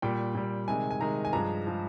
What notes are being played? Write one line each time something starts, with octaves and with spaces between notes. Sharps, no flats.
A#2 G3 G5
A#2 G3
C3 D#3 G#3 G#5
G#5
C3 D#3 G#3 A#5
G#5
G2 F3 G#3 A#5
F3 G#3